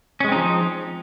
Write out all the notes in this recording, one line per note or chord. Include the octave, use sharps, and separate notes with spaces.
F3 G#3 C4 C#4 D#4